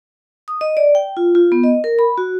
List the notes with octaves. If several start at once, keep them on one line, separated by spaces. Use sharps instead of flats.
D#6
D#5
D5
G5
F4
F4
B3
D#5
A#4
B5
F#4